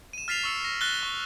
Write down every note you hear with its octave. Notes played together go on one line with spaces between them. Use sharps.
D#7 E7
F6 A6 B6 C7 E7 F7
C#6 E6 C#7
A#6
F6 F#6 A6 G7
C#6